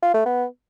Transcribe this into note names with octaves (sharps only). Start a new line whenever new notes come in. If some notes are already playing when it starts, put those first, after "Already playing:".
F4
A3
B3